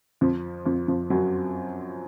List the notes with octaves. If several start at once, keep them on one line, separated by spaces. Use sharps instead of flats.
F2 F3
F2 F3
F2 F3
F#2 F#3